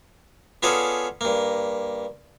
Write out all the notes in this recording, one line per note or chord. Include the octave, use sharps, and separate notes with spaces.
B3 C#4 F4 G#4 A4 D5
G2 A#3